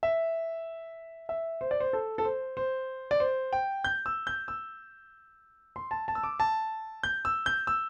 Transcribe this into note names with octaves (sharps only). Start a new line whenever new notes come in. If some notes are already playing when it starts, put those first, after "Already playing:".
E5
E5
C5
D5
C5
A4
A4
C5
C5
D5
C5
G5
G6
E6
G6
E6
C6
A5
A5
E6
D6
A5
G6
E6
G6
E6